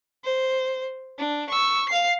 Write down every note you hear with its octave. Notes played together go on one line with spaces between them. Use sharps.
C5
D4
C#6 E6
F5 C7